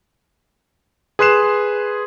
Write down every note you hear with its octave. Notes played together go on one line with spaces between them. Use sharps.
G#4 B4 C6 F#6 C7 E7